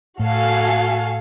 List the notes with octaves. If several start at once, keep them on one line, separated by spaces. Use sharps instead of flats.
A2 F#4 A4 F5 G#5